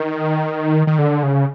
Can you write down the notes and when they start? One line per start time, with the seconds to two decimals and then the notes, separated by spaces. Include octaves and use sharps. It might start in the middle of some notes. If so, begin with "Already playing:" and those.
Already playing: D#3
0.87 D#3
0.98 D3
1.23 C#3